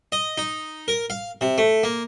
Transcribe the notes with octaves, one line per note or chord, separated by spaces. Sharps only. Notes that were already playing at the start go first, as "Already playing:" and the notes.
D#5
D#4
A#4
F5
C3
A3
A#3